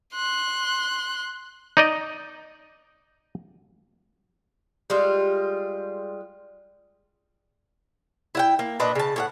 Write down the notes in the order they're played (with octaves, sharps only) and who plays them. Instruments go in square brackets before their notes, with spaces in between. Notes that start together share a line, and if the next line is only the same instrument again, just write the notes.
[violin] C6 F#6
[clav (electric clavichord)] D#4 D5 D#5
[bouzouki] G3 G#3 F4
E4 F#5 G5
A#3
A#2 D4 B4 D#5
C#3 A5
A2 G4 F#5